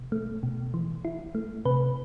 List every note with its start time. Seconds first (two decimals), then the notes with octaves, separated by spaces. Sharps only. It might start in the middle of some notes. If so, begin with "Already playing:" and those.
Already playing: B2
0.12 A3
0.43 B2
0.74 E3
1.05 E4
1.35 A3
1.65 C3 B4